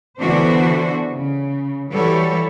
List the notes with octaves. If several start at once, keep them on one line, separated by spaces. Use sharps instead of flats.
D3 E3 B3 D4 F#4 C5
C#3
E3 G3 F#4 A4 B4 C#5